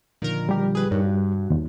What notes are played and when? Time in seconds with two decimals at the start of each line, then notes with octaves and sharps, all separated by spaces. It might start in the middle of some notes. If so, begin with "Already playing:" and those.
0.22 A#2 D3 D#3 F3 A#4
0.49 G3 G4
0.75 G#4 B4
0.91 G2 D#4 A#4 C#5
1.05 F#4
1.50 D#2